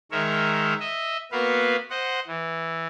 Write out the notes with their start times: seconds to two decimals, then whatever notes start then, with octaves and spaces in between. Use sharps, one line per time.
0.11 D#3 G#3 A#4 C#5 E5
0.80 D#5 E5
1.32 A#3 B3 F#4 B4 F5
1.90 C5 D#5 F#5
2.27 E3